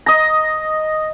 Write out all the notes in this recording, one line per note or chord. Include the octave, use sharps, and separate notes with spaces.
D#5 A#5